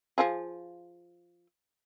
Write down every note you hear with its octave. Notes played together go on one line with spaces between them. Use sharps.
F3 F4 G#4